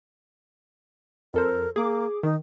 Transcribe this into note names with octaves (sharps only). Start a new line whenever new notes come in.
F2 A4 A#4 C5
A#3 G#4 D6
D#3 D#4